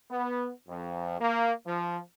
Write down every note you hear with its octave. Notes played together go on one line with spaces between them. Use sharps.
B3
F2
A#3
F3